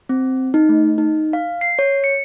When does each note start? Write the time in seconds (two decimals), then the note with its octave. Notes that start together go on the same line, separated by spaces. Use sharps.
0.09 C4
0.54 D#4
0.69 A3
0.98 D#4
1.33 F5
1.61 C7
1.79 C#5
2.04 C#7